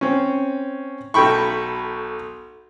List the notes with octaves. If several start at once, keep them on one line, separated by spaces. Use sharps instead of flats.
C4 C#4
B1 A4 G5 B5 C#6